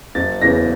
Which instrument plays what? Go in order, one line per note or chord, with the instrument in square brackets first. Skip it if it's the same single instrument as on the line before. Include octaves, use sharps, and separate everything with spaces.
[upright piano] F#1 A6
E2 C#3 E3 A#6